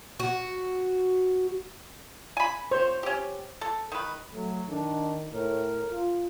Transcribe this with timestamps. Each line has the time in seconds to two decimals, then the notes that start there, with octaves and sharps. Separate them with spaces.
0.19 F#4
2.37 G#5 B5
2.71 C5 C#5
3.03 C#4 G4
3.61 A4
3.92 D#3 B4
4.33 F#3 A3
4.68 D#3 D4
5.33 A2 A#4
5.91 F4